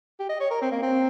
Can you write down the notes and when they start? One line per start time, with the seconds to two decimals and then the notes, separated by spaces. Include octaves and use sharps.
0.19 G4
0.29 D#5
0.40 C#5
0.51 A#4
0.61 C4
0.72 A#3
0.82 C4